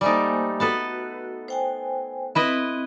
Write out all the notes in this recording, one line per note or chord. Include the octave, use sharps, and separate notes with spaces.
G3 A3 A#3 D#4 C5 G#5
B3 F#4 A4 B4
C5 G5 G#5
C4 E4 B4 D#5